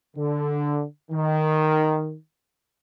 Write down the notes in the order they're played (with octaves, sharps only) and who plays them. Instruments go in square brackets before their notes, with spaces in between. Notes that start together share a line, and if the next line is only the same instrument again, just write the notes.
[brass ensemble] D3
D#3